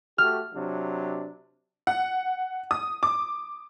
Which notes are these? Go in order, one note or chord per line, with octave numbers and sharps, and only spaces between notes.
A3 F#4 G4 F6
C3 F#3 D4
F#5
D#6
D6